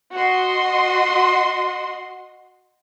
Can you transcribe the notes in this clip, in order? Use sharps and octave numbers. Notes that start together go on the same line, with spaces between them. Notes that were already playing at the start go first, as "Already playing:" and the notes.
F#4 D#5 C6